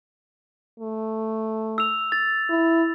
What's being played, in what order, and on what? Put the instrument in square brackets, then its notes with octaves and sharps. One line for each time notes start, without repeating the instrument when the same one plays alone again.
[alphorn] A3
[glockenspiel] E6 F7
A6
[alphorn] E4